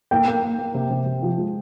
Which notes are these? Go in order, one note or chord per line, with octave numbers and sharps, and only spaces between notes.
A#3 G5
A#3
A#3
A#3
C3
C3
C3
F3
G#3